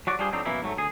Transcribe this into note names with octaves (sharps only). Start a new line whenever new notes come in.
F#3 F#4 D5
G3 D4 F4 G#4 C5
F2 F#3 C4 D4 D#4
F#2 B2 E3 A#3 E4
G#2 F#3 A3
D2 G#4